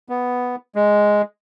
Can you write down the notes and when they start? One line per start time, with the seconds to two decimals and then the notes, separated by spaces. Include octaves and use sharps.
0.09 B3
0.75 G#3